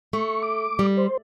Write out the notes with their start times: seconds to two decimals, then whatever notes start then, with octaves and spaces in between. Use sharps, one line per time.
0.13 A3 C#6
0.43 D6
0.79 G3
0.97 C5